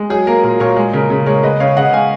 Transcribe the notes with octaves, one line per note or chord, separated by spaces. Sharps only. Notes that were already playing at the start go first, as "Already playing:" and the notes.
Already playing: G#3
F#3 G#4
A#3 A#4
A#2 A#4
A#2 A#4 C#5
G#3
C#3 A#4
C#3
G#3 A#4 C#5
G#3 B4 D#5
C#3 C#5 F5
C#3 D#5 F#5
G#3 F5 G#5